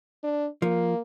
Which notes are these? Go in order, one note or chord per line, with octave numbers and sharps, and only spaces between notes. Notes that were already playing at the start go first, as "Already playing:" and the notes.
D4
F3 A#3